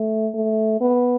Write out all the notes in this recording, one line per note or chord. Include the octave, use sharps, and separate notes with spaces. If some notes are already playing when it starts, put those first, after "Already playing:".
Already playing: A3
A3
B3